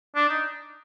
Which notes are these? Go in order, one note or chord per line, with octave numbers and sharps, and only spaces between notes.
D4
D#4